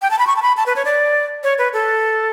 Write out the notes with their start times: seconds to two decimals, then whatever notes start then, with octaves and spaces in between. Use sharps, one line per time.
0.02 G5
0.11 A5
0.19 B5
0.27 C#6
0.36 A5
0.42 B5
0.57 A5
0.66 B4
0.76 C#5
0.85 D5
1.44 C#5
1.58 B4
1.73 A4